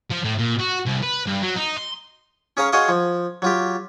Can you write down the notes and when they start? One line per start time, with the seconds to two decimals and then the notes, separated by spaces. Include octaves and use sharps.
0.11 F3
0.25 A2
0.39 A#2
0.60 F#4
0.86 C2
1.03 B4
1.27 G2
1.43 F#3
1.57 D#4
1.77 C6
2.57 C#4 G#4 C#5 F5 A#5
2.72 F#4 G#4 C#5 D#5 F5 C6
2.88 F3
3.42 F#3 F4 G4